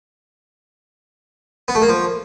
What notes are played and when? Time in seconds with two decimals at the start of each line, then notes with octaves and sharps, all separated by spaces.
1.68 B3
1.75 A3
1.82 A#3
1.89 F3